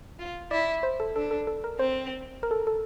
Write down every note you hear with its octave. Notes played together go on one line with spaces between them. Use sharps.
F4
E4 D5
C5
A4
D4 A4
A4
A4
A#4
C4 C5
A#4
A4
A4